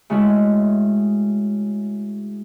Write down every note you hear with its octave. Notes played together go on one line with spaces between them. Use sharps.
C#3 G#3 A3 E4 F#4